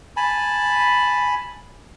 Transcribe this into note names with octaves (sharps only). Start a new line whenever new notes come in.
G#5 A5 B5